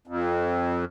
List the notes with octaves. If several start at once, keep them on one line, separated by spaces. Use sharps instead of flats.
F2